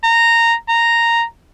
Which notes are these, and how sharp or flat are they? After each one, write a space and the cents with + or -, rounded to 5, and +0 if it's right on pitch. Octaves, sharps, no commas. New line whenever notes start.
A#5 -10
A#5 -5